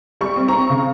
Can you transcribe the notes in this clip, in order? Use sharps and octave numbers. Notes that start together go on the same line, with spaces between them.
G3 C#6
C4
C4 A#5 C#6
C#3